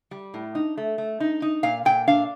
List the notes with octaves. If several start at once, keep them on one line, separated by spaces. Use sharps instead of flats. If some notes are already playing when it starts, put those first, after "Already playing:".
G3
A2
D#4
A3
A3
D#4
D#4
A#2 F5
A#2 G5
D4 F5